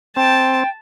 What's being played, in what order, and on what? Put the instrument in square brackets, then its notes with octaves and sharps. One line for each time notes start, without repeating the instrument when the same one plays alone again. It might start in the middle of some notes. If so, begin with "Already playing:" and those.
[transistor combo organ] C4 [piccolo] G5 [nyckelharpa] A5